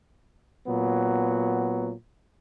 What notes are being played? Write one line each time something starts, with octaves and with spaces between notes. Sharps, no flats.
A#2 F#3 B3